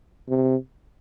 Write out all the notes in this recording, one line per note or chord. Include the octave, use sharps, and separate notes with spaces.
C3